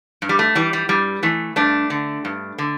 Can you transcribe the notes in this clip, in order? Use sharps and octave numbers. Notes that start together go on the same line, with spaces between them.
G2
G3
A3
E3 G3
G3
G2 G3
E3 A3
G2 A3 D4
D3
G2
D3